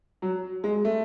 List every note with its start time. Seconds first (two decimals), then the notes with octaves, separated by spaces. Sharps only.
0.22 F#3
0.64 G#3
0.85 A3